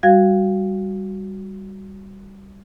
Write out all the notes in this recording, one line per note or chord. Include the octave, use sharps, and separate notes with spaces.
G3 F#4 F5 G#6